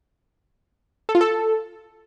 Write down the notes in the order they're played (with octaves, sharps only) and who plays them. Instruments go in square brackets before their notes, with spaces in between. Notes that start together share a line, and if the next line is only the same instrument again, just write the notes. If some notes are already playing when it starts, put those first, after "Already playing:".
[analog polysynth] A4
F4
A4